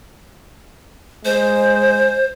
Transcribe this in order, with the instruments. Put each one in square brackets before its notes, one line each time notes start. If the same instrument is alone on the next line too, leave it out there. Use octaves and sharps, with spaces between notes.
[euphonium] G#3 [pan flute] C5